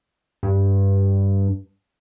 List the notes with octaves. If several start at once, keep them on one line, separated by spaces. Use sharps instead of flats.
G2